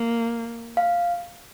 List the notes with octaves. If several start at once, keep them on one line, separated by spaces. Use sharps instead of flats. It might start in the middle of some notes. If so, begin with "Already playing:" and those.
Already playing: A#3
F5